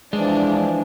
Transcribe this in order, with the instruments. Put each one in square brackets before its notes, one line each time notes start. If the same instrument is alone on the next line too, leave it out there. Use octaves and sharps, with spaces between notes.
[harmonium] E3 F3 [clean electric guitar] G#3 [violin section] D4